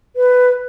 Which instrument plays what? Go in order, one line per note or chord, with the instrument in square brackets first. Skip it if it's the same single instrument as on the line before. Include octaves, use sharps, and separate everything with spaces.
[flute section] B4